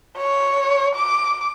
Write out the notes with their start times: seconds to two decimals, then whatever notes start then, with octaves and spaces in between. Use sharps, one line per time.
0.17 C#5
0.95 D6